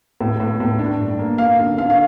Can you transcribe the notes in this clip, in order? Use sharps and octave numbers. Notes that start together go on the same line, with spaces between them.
A2
A2
A2
D4
G2
A#3
A#3 F5
D3
D3 F5
F5